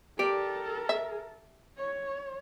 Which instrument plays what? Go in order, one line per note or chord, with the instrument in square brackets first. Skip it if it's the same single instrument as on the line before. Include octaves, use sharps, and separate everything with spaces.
[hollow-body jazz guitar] G4 D5 [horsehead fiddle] A4 A#4
[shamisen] E5
[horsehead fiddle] C#5